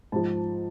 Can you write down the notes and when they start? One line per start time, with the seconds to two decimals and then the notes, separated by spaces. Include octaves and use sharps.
0.12 G#2 F3 A5